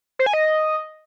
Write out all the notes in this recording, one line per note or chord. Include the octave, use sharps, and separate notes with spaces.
C5
G#5
D#5